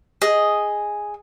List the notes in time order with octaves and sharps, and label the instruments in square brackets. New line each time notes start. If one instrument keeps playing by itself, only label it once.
[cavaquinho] G#4 D#5